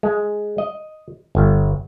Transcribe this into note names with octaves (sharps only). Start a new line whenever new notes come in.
G#3
D#5
G1